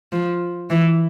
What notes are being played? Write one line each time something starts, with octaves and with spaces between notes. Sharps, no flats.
F3
E3